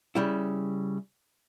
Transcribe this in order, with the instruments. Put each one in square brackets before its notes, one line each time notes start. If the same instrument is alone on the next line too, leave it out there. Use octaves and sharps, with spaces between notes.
[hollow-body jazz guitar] C#3 G3 E4